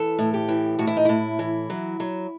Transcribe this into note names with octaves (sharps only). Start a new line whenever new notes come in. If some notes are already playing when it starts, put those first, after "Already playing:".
Already playing: E3 A4
A2
G4
E3
A2 F#4
E4
D#4
A2 E4
E3
F#3
F#3